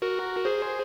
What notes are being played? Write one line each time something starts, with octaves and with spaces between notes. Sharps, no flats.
F#4 A#4
G#4 C5